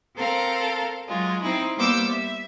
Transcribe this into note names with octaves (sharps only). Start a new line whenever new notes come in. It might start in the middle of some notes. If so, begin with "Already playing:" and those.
C4 A4 A#4 F5
F#3 G#3 F4
C4 D#4 E4
G3 A#3 B3 C5 D6 E6
E5